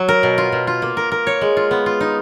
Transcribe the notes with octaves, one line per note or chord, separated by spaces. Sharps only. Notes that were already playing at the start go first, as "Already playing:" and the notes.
Already playing: F#3
A#4
B2
F4
B2
F4
A#3
A#4
A#4
C#5
G#3
F4
B3
F4
D#4